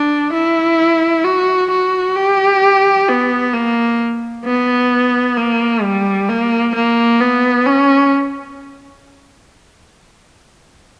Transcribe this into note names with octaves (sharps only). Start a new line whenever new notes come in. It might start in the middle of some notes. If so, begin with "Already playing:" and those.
Already playing: D4
E4
F#4
F#4
G4
B3
A#3
B3
A#3
G3
A#3
A#3
B3
C#4